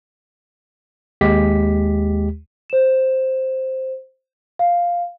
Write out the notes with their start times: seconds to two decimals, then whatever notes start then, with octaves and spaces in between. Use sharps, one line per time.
1.21 D#2 G#3 G4 B6
2.70 C5 E7
4.59 F5